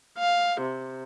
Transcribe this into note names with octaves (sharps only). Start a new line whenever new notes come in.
F5
C3